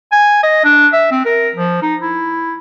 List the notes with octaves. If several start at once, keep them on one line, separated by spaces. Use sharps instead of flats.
G#5
D#5
D4
E5
C4
A#4
F3
D#4
E4